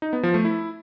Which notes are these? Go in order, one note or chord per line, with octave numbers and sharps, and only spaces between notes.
D#4
B3
F3
A3
E4